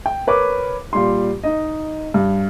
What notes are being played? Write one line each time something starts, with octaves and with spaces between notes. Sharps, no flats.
G5
A#4 B4 C#5 D6
A#2 G3 C6
D#4 D#5
G2